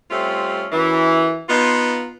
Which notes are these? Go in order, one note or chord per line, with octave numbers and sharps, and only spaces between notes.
G3 A3 C4 C#4 F4
F#2 E3
B3 D#4 F4